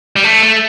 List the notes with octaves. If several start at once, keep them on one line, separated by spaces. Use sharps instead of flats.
G3
A3
A3